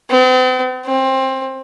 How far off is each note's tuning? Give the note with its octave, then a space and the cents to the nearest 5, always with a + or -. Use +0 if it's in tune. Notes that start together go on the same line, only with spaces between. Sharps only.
C4 -45
C4 +20